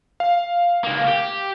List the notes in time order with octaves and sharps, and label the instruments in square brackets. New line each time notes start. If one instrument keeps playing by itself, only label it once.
[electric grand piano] F5
[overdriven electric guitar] C#2 A#3
G4